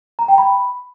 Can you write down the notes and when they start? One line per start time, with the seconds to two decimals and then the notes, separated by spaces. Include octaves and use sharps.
0.19 A#5
0.28 G5
0.38 B5